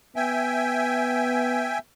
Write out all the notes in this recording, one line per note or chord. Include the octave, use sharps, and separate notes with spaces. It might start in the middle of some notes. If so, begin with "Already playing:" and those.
B3 E5 G5 G#5